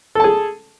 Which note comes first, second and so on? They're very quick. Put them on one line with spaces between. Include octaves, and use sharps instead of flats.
A4 A5 G#4